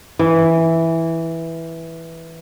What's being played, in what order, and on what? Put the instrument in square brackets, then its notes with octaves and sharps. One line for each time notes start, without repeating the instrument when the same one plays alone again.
[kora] E3